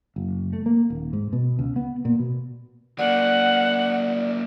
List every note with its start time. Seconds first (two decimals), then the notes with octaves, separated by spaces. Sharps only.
0.16 F#1
0.53 A3
0.66 A#3
0.90 D#1
1.13 G#2
1.33 B2
1.59 C#2
1.76 B3
2.05 A#2
2.19 B2
2.99 F#3 A#3 D5 F#5